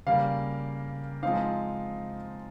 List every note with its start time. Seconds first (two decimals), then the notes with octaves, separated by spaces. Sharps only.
0.07 C#3 G3 A#3 F5
1.22 F3 G#3 C4 D#4 F5